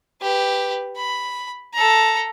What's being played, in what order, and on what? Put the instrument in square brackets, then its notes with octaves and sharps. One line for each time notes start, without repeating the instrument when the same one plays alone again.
[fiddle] G4 B4
B5
A4 A#5